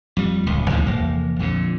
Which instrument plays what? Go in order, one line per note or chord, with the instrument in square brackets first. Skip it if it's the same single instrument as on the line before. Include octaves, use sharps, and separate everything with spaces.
[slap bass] F2 G3
D1 C#2
D2 C3 D#3 E3
F1 E2 A#3
A#1 F2 A#2 D3